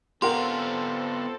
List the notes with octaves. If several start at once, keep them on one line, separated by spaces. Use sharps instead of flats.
B3 C4 F4 G4 A4 A#4 F#5 C6